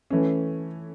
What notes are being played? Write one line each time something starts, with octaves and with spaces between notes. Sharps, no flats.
E3 A3 C#4